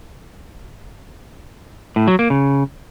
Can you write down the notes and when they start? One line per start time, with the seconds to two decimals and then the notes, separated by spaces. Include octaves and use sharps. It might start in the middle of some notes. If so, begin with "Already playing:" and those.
1.96 A2
2.08 F#3
2.19 A#3
2.30 C#3